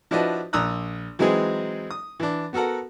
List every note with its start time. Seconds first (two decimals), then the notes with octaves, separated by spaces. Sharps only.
0.11 F3 D4 E4 F#4 B4 D#5
0.53 A#1 A#5 D#6 E6 F#6
1.19 E3 F#3 G#3 C4 D#4 G#4
1.90 D#6
2.20 E3 D4
2.53 B3 F#4 A4 A#4 F#5